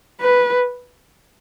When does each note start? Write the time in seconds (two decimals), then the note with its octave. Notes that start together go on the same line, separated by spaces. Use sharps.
0.21 B4